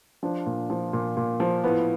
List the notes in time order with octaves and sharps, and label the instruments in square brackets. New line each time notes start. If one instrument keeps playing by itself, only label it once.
[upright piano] F3 D4
A#2
F3
A#2
A#2
F3
A2 B3